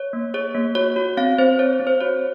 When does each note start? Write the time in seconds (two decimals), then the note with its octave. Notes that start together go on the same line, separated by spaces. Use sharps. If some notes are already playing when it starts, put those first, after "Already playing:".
Already playing: C#5
0.13 A#3
0.34 G#4 C#5
0.55 A#3
0.75 F#4 C#5
0.96 F#4
1.17 C4 F5
1.38 C4 C5
1.59 C4 C#5
1.73 C#5
1.80 C4
1.87 C5
2.01 F#4 C#5